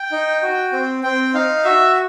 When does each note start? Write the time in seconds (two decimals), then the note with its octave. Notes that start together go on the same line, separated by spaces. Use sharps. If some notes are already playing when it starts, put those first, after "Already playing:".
Already playing: G5
0.12 D#4
0.42 F#4
0.72 C4
1.03 C4 G5
1.34 D#4 F5
1.65 F#4 E5